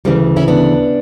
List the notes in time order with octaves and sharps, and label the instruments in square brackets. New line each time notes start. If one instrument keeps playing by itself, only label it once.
[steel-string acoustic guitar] D2 C#3 E3 G3
C#4 E4
B3 D4